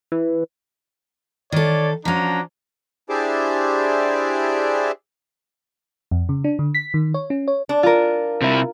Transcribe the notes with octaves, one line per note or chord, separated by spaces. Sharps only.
E3
D#3 A4 C#5 D5
F3 C#4 D4 F#4 A#5
D4 E4 G4 G#4 C5 D5
F2
C#3
D4
D3
B6
D#3
C#5
C#4
C#5
D4
F4 A#4
C3 E4